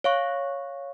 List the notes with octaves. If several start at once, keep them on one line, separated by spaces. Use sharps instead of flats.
C#5 F5 C#6